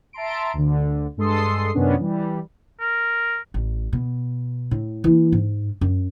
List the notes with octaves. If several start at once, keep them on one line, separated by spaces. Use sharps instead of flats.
E5 A5 A#5 C6 D7
D2 D3
G2 G#3 A4 C6 D#6 C7
F#2 C3 D#3 B3 C#4 D4
E3 G3
A#4
A1
B2
A2
E3 A#3
G#2
F#2